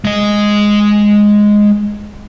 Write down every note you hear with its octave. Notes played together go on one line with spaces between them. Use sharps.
G#3 D#5